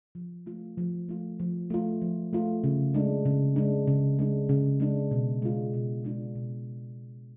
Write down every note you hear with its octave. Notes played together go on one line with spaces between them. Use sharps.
F3
A3 F4
F3
A3 F4
F3
A3 F4
F3
A3 F4
C#3
G#3 D4
C#3
G#3 D4
C#3
G#3 D4
C#3
G#3 D4
B2
G#3 D4 F4
B2
G#3 D4 F4
B2